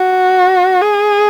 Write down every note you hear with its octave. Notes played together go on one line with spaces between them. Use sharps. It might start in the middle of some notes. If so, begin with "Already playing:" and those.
Already playing: F#4
G#4